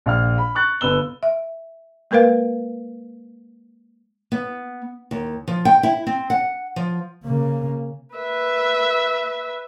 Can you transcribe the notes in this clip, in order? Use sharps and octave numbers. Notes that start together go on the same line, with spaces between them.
A#1 F5 F6
B5
C#6 F#6 A6
G1 B4 E6 G7
E5
G#3 A#3 A#4 B4 F5
B3
D#2
F3
G5
E4
C4
F#5
F3
C#3 A#3
B4 E5